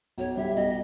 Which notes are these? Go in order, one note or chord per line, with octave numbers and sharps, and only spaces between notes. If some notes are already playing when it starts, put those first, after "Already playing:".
B1 C#5
G3 E5
B1 D#5